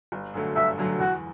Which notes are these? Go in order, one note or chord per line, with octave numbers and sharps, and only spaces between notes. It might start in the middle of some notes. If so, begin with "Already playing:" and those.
G1
F#2 D3 F#3 A3
G1 E5
F#2 D3 F#3 A3
E2 F#4